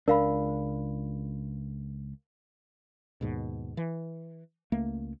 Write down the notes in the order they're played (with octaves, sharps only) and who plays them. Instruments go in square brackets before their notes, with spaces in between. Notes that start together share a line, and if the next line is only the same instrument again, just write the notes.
[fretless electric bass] C#2 D4 [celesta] A#4 F5 B5
[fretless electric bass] D#2 G#2 B2
E3
C#2 A3 A#3